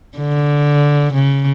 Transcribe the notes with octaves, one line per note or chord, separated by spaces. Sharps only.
D3
C#3